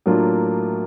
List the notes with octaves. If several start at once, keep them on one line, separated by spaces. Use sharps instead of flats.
A2 F#3 A#3 D4 F4